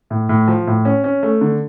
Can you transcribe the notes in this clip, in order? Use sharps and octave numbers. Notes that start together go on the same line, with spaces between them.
A2
A2
F3
A2
C#4
C#4
A3
D3